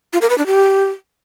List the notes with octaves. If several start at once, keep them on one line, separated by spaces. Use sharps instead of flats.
F4
A#4
B4
D4
G4